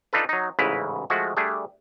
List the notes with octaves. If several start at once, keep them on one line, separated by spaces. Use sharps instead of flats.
D4 D#4 F4 A4 B4
F#3 D#4
A1 G#2 C#3 E4 B4 A#5
F3 G#3 A3 F#4
G3 A3 D4 G#4